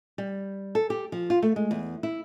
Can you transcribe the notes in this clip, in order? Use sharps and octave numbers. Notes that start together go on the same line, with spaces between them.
G3
A4
G4
F3
F4
A3
G#3
E2
E4